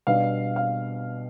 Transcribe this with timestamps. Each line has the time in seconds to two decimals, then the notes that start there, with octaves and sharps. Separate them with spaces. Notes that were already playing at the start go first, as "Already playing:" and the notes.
0.07 B2 G3 B3 D4 F5
0.56 F5